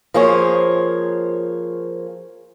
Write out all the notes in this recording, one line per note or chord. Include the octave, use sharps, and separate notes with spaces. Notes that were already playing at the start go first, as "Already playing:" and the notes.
F3 A#3 G#4 C5 C#5